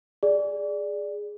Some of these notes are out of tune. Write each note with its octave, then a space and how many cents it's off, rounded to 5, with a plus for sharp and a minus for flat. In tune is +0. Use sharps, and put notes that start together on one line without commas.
G#4 +0 D5 +0